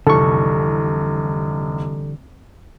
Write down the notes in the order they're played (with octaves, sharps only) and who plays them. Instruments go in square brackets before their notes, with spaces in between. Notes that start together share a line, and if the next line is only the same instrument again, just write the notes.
[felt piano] F1 C2 [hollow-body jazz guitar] D3 E3 G3 [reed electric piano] A4 C#6